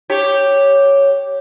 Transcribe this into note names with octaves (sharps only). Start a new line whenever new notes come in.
G4 C#5